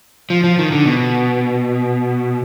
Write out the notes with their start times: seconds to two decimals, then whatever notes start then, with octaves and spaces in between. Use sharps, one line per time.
0.30 F3
0.44 F3
0.58 D#3
0.72 D3
0.86 B2